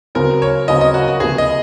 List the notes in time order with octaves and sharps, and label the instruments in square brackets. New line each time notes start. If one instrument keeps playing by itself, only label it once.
[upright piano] C#2 C#3 F#3 C4 [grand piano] A#4
[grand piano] C#5
[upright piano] C#2 C#3 F#3 C4 [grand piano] D#5
[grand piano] D#5
F#4
F#4
[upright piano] C#2 C3 F3 A#3 [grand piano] G#4
[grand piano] D#5